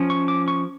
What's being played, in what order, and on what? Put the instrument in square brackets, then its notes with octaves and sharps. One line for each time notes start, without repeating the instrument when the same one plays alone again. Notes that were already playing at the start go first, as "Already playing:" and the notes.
Already playing: [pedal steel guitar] F3 C#4
C#6
D6
C#6